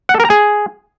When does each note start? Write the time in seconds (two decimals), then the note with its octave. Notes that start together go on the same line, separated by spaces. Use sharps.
0.09 F#5
0.14 A4
0.20 A#4
0.25 A#5
0.30 G#4